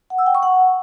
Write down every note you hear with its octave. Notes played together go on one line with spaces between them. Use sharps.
F#5
E6
G5
C#6
F#5